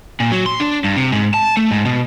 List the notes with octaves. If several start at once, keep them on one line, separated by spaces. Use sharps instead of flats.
A#2
F#3
C6
D4
G2
C3
G#2
A5
A3
G#2
B2